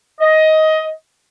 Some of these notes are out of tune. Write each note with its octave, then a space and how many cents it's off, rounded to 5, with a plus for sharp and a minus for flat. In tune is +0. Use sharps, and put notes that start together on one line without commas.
D#5 +15